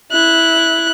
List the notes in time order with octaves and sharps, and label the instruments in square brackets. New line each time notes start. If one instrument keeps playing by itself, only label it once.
[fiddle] E4 F#6